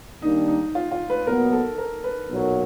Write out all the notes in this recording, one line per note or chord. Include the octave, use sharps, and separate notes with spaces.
D#3 G3 A#3 D4 D#4
D#4
F4
F4
B4
A#2 F#3 B3 A#4
A4
A#4
B4
B1 A#2 F#3 A#3